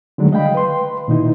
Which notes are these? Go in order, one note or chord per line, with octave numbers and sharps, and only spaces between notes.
D3 D#3 F#3 G#3 A3 D4
D#5 F5 G5 B5
B4 C6
A#2 D#3 D#4 E4